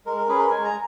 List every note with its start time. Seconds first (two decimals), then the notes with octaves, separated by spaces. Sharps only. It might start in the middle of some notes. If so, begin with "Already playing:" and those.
0.05 G#3 A#4
0.17 A#4
0.28 C#4 G#4 B4
0.39 A#4
0.50 G#3 G#5
0.65 A#5